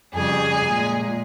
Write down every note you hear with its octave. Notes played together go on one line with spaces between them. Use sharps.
F2 C#3 G3 G#4 G#5
A#2 G#3